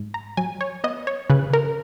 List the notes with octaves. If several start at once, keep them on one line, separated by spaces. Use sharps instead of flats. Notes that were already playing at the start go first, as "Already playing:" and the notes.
Already playing: G#2
A#5
F#3 G#5
C#5
B3 D#5
C#5
C#3 B4
A#4